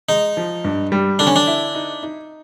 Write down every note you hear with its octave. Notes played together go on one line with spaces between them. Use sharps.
G#3 D#4
F3
G2
G3
D3 D4
C#4
D4
E4
D#4
D#4